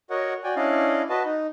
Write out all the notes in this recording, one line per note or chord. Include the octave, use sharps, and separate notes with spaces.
F#4 A#4 C#5 D#5 F#5
F#4 D5 G5 G#5
C#4 D4 E4 D5 D#5 F5
F#4 B4 D#5 A5
D#4